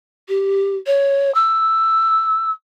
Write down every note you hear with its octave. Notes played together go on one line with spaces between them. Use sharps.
G4
C#5
E6